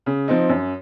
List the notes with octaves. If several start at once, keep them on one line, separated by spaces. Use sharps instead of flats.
C#3
F3 C4 D#4
F#2